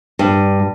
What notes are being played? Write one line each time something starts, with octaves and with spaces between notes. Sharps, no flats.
G2